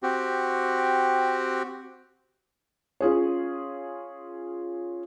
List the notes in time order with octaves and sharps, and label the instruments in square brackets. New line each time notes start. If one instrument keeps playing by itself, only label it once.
[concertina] C4 F#4 G4
[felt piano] C#4 F4 G#4 C#5